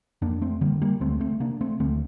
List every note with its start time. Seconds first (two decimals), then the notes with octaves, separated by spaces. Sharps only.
0.22 F2 A#3 D4
0.42 A3 C4
0.61 D3 G3 A#3
0.82 G3 A#3
1.01 D2 A3 C4
1.21 A3 C4
1.40 C3 A#3 D4
1.61 A3 C4
1.80 D2 A3 C4